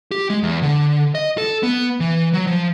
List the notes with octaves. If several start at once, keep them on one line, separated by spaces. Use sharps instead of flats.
G4
G#3
E2
D3
D#5
A4
B3
E3
F#3
F3